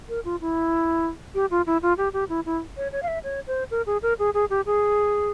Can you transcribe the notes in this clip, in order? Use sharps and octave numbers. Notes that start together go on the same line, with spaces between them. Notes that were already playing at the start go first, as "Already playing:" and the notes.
A#4
F4
E4
G4
F4
E4
F4
G4
G4
E4
E4
C#5
C#5
F5
E5
C#5
C5
A#4
G#4
A#4
G#4
G#4
G4
G#4